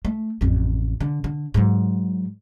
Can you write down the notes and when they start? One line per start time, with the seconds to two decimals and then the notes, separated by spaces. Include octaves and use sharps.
0.05 A3
0.41 A1 F2
1.00 D3
1.24 D3
1.54 G#2 F#3